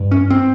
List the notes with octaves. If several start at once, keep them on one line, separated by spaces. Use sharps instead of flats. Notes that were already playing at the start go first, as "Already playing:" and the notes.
Already playing: G2
C#4
C4